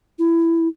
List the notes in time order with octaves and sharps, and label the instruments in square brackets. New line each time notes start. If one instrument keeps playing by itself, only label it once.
[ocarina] E4